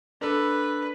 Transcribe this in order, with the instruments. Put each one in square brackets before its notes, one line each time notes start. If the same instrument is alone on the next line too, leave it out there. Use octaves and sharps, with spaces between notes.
[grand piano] D4 A4 [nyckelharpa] B4